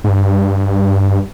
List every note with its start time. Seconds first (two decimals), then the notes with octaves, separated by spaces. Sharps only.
0.04 G#2
0.09 G2